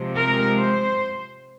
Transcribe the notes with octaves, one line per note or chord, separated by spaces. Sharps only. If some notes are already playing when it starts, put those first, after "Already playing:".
Already playing: C3 F3 G#3 C4
A#4
C5